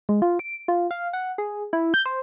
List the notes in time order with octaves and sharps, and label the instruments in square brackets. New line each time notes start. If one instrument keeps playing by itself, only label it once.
[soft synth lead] G#3
F4
D7
F4
F5
F#5
G#4
E4
G6
C5